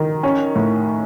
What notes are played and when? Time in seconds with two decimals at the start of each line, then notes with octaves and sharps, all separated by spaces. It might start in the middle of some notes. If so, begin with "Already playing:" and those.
Already playing: D#3
0.23 C#4
0.55 A2